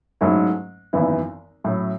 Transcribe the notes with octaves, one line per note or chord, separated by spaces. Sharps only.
G#2 F#3 A3 C#4 E4
G#1 F#2 E3 B3 E4
A2 F#3 C#4 E4